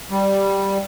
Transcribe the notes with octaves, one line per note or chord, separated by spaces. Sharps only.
G3